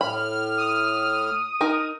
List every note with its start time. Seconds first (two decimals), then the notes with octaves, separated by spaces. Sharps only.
0.01 A2 B5 F6
0.58 D#6
1.61 D#4 A#4